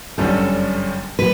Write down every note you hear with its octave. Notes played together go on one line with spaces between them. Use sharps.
G1 F#2 D3 G3 C#4 A4
B4